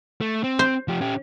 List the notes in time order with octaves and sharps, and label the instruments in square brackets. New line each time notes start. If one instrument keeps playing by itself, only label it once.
[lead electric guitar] A3
C4
[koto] C5
[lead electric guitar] F3 G4
C#4 G4